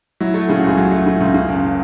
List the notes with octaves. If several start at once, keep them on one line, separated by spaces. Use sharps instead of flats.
F#3 E4
A3
C#3 G#4
F#4
C#2
G#4
F#3
A3
C#3
C#2
C#3
F#1